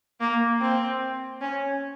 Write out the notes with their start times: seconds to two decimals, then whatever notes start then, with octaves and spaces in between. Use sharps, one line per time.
0.20 A#3
0.61 C4
1.41 C#4